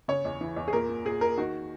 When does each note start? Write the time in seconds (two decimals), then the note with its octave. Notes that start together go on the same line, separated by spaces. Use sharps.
0.08 C#3 C#5
0.25 E2
0.41 E3
0.56 E2
0.68 G#4
0.73 A#2 A#4
0.89 A#2
1.05 A#2 G#4
1.21 A#2 A#4
1.38 D#3 F#4